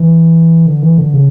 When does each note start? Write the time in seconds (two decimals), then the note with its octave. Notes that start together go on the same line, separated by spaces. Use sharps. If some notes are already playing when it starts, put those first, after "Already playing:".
Already playing: E3
0.66 D3
0.82 E3
0.98 D3
1.14 C#3